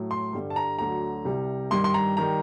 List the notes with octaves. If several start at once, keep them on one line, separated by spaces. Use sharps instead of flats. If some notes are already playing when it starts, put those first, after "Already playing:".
Already playing: A2 F#3
C6
G2 D3 G3
A5
A#5
D2 D3 F#3 A#5
C2 C3 G3
G2 D#3 G3 C6
C6
A#5
D#3 G3 A#5